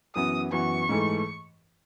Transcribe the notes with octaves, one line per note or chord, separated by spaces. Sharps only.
F#2 E3 B3 F#4 D#6
F#2 E3 B3 F#4 C#6
G#2 E3 A3